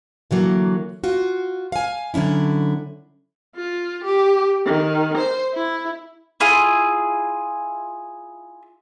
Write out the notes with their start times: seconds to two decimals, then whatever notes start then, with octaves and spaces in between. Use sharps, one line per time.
0.31 D3 E3 F#3 A#3
1.04 F4 F#4
1.72 F5 G#5
2.14 D3 F#3 C#4 E4
3.56 F4
4.04 G4
4.66 D#3
5.18 C5
5.54 E4
6.40 E4 F4 G#4